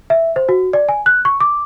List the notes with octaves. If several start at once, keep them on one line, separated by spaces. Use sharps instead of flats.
E5
C5
F#4
D5
G#5
F#6
C#6
D6